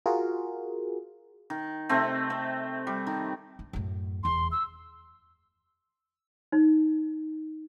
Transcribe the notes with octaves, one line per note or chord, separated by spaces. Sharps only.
F4 F#4 G#4 A#4
D#3
C3 A3 C4
C4
G3
D#3
D3
F#2 A2
F1 E2 C6
E6
D#4